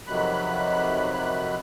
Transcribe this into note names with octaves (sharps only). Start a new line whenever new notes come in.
F2 C3 D#3 F#3 B5 F#6